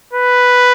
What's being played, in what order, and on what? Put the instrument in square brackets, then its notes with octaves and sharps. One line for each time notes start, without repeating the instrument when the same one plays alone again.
[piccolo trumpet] B4